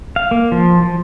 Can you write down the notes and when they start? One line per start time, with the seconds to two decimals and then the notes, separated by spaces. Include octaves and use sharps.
0.16 F5
0.31 A#3
0.52 F3
0.82 F3